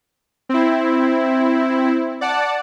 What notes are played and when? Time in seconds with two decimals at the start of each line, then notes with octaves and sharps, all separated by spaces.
0.49 C4 E4
2.21 D5 F#5 A5